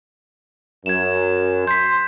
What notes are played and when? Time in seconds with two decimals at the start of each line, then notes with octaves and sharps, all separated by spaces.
0.86 F#2 G#6 E7
1.68 C6 G6 B6